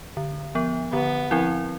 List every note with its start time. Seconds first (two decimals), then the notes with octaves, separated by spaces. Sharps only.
0.17 D3
0.55 F3 B3
0.93 D3 B3
1.31 F3 C4 E4